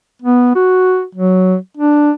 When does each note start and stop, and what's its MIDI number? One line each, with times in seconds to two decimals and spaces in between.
0.22 0.55 59
0.55 1.04 66
1.15 1.56 54
1.77 2.11 62